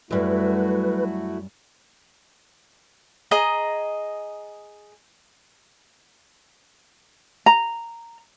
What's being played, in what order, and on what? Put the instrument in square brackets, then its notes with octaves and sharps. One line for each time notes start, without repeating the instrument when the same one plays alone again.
[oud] F#2 G3 [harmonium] A3 E4 F#4 [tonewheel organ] B4
[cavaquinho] G#4 D#5 A#5
[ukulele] A#5